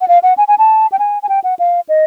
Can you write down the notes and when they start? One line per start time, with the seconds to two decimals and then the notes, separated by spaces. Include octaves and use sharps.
0.01 F#5
0.08 F5
0.23 F#5
0.38 G#5
0.48 G#5
0.59 A5
0.92 G5
0.99 G#5
1.23 G#5
1.29 G5
1.44 F#5
1.59 F5
1.89 D#5